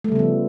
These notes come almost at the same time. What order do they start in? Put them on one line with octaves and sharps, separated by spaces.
A3 G3 C#3 B3 F3